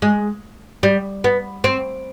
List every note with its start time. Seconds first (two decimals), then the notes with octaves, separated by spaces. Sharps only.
0.02 G#3
0.83 G3
1.24 B3
1.64 C4